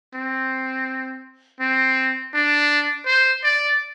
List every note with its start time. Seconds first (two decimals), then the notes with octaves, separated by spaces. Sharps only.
0.14 C4
1.60 C4
2.34 D4
3.06 C5
3.44 D5